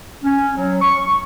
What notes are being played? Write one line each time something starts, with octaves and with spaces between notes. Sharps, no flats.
C#4
F#3
C#6